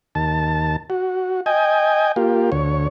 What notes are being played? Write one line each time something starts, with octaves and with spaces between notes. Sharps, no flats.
D#2 A5
F#4
D#5 G5 G#5
A#3 F4 G4
D2 C#5